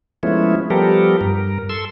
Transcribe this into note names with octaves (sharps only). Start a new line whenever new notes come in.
F3 G#3 A3 B3 C#4 E4
F3 G3 B3 G4 A4 A#4
G2 A#4
A4 C6 E6